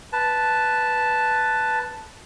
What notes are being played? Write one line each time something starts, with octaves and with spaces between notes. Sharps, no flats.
B4 A5